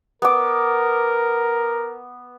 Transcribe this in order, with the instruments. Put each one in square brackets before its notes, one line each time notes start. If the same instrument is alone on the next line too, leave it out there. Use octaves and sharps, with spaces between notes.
[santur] B3 D6 [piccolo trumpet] A#4